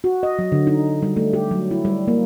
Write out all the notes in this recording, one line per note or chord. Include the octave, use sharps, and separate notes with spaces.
F#4
D#5
F#3
D3
D#4
G3
A3
G4
F#3
E4
G3
A#3